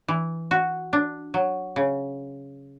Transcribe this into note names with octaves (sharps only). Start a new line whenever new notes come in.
E3
F#4
D4
F#3
C#3